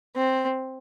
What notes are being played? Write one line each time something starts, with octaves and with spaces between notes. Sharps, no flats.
C4